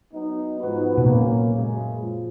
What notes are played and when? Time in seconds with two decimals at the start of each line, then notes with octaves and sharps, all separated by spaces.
0.13 F#3 B3 D#4
0.59 G#2 F3 B3 F#4 B4
0.98 B2
1.06 A#2 F#3 A#3 C#4
1.53 F#2 C#3 G#3
2.01 F3